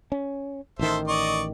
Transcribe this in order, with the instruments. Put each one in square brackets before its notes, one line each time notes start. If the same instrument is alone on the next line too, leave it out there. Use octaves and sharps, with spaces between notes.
[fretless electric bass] C#4
[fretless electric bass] A1 D#3 [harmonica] A4 C5 E5
[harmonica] D5 D#5 C#6